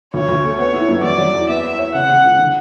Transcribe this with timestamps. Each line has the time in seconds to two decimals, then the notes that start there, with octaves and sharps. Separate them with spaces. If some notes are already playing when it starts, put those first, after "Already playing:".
0.14 D2 C#5
0.29 D2
0.44 A3
0.59 B3 C#5
0.74 E4
0.89 F#2
1.03 F#3 D5
1.18 F#3
1.34 E2
1.49 B3 E5
1.63 B3
1.79 C#5
1.94 C#3 F#5
2.09 C#3
2.24 C#2
2.39 D3